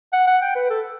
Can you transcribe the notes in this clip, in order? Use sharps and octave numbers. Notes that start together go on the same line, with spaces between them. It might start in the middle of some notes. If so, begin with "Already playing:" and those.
F#5
F#5
G5
B4
A4